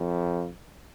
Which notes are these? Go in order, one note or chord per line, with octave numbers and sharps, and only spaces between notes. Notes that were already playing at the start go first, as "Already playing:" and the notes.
Already playing: F2